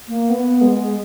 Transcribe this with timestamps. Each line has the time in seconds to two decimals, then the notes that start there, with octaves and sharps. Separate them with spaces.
0.08 A#3
0.29 B3
0.62 G#3